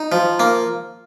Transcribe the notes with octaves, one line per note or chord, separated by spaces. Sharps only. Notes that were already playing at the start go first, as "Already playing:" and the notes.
Already playing: D#4
F3
A#3